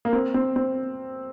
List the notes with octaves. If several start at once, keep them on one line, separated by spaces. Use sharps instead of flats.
A#3
C4
C4
C4